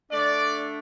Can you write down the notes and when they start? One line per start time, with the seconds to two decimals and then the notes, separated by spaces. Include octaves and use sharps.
0.11 D3 A3 D4 D5